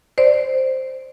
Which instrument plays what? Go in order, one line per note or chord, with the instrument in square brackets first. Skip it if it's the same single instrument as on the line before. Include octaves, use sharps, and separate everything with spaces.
[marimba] C5 D5